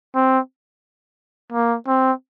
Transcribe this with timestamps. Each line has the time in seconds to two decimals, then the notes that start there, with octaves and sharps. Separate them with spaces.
0.15 C4
1.52 A#3
1.88 C4